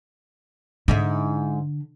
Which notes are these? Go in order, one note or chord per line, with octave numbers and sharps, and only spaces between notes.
G#2 D3 D#4 E4